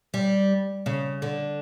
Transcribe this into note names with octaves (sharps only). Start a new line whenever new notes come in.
G3
C#3
D3